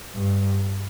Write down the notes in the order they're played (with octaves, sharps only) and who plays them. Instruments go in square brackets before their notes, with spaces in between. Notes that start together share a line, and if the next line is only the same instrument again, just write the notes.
[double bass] G2